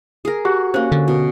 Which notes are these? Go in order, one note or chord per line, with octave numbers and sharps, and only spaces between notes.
G#4 A#4
F#4 G4
A#3 C#4 C5
D3
B2